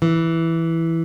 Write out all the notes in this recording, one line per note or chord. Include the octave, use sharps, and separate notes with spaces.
E3